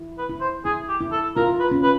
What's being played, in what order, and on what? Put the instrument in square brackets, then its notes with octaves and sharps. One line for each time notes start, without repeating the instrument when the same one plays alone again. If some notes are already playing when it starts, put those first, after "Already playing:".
Already playing: [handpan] E4
[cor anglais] B4
[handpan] E4
[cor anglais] C5
[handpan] E4 [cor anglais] G#4
[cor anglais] G4
[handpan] E4
[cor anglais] A4
[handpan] F4 [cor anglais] A#4
[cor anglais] B4
[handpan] C#4
[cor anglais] B4